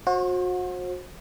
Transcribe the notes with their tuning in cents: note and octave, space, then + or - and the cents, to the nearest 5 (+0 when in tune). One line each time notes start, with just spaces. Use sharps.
F#4 -30 C5 +35